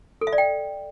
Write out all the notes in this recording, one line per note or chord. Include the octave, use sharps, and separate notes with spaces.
A4
E5
D5
G5